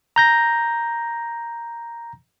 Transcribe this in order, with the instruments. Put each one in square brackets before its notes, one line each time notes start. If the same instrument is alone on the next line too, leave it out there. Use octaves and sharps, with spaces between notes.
[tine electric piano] A#5 G6 A#6